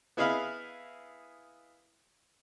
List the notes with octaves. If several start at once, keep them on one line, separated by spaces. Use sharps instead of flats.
B3 E4 G#4 D#5 F5 B5